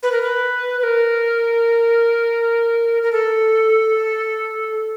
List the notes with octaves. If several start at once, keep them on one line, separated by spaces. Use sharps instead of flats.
B4
A#4
B4
B4
A#4
A#4
A4